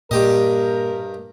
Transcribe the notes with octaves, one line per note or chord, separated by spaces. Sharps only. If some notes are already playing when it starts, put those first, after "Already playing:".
G2 A#2 G4 A#4 D#5